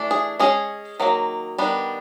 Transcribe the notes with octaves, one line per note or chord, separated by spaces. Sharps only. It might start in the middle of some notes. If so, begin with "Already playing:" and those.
Already playing: E3 A3 D4
G#4
G#3 C#4 G#4
D#3 F#3 A#3
D#3 G3 B3 D4